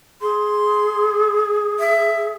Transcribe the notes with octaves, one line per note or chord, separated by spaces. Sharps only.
G#4 C6
E5